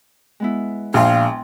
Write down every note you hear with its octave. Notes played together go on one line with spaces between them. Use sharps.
G#3 B3 E4
A#1 F5 G5 C6